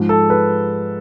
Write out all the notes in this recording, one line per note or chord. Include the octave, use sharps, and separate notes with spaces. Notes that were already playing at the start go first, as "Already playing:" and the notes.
Already playing: G#2 F3 G#3
A4
B4